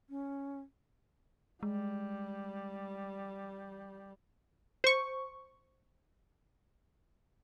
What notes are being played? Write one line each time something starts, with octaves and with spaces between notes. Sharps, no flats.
C#4
G3 G#3
C5 C#6